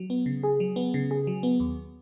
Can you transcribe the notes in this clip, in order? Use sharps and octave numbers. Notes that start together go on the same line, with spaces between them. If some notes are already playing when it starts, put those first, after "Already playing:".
Already playing: F#3
B3
C#3
G#4
F#3
B3
C#3
G#4
F#3
B3
D#2